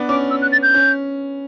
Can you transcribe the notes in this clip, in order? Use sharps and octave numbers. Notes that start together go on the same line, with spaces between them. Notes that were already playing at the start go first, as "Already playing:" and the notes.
Already playing: B3 D4
C#4 D6
E6
F#6
A6
G6
C#4